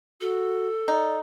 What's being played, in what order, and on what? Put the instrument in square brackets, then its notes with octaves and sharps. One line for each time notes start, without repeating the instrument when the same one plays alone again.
[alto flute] F#4 [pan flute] A4
[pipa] D#4 [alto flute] D5